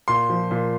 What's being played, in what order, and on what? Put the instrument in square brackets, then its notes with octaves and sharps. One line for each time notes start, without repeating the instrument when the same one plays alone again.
[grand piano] A#2 C6
F3
A#2